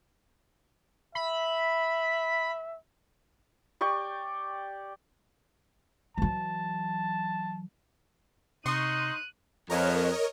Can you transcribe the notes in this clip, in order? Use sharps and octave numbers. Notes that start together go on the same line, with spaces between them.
E5 B5
G4 D5 G5 C#6
E3 F#3 A5
C3 D#4 C6 C#6 D#6 F#6 D#7
F2 A#4 C#5 D#5